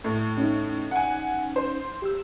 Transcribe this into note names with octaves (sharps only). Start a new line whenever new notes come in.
A2
C#4 D#4
F#5 G#5
C5
G4 E6